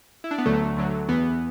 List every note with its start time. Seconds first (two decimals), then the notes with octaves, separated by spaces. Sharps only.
0.24 E4
0.31 D4
0.38 B3
0.46 D2 D3 F#3 A3
0.76 D2 D3 F#3
1.08 E2 E3 B3